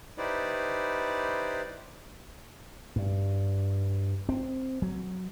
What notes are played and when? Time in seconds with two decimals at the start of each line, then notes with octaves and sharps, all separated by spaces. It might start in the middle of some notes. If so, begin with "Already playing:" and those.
0.18 D#4 E4 G4 B4 C5 D5
2.96 G2
4.29 C4
4.82 F#3